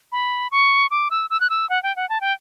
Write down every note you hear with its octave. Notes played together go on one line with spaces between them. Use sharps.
B5
C#6
D6
E6
E6
F#6
E6
F#5
G5
F#5
A5
G5